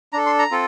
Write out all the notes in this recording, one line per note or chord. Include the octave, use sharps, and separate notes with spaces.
D4 A4 A#5
C6
A#5
C4 F4 A4